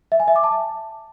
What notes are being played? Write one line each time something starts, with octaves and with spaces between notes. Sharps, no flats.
E5
G#5
E5
D6
A5